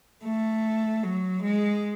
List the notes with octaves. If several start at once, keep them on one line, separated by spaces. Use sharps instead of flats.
A3
F#3
G#3